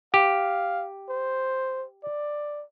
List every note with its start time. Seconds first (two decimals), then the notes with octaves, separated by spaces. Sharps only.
0.14 G4 F5
1.09 C5
2.04 D5